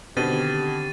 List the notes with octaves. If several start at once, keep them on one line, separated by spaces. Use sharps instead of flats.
B2 D3 D#3 C4 G4 A6 D#7